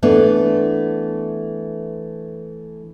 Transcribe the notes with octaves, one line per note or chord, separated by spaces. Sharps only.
E3 A3 B3 D4